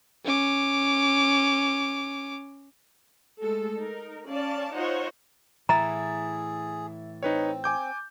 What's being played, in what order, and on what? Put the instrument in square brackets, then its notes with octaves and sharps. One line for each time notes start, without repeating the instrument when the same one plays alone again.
[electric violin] C#4 D6
[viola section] G#3 A3 A4
D#4 A#4
C#4 D5 F5 A5
D#4 F4 C5 C#5 D#5 F#5
[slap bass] A2 E3 [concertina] G#4 [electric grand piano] E5 A6 [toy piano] A#5
[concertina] C4 [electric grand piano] D#4 B4 C#5
[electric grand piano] G#5 D6 G6